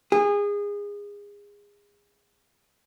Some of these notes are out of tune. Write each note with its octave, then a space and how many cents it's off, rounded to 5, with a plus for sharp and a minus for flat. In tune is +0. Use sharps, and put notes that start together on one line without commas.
G#4 -25